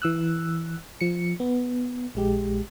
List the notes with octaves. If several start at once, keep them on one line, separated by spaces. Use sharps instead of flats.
E3 E6 F#6
F3 C#7
B3
A#1 G#3 G4